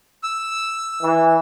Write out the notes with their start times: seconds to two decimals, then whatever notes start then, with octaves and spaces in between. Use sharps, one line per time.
0.23 E6
1.02 E3